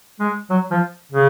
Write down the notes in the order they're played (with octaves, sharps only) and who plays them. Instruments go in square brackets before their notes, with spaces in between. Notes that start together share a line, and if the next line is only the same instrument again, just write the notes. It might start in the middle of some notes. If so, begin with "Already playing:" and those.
[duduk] G#3
F#3
F3
C#3